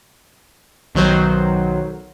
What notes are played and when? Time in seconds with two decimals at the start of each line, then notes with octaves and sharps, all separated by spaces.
0.95 B1 D#3 F#3 C5